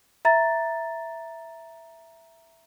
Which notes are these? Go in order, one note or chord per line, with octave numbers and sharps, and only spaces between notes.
E5 A#5 A6